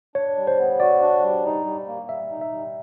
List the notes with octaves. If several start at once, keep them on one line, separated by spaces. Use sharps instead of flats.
D4 C#5
G3
C5
B3
F#4 D5
D4
G3
D#4
G3
A#3
G3 E5
D#4
E5
G3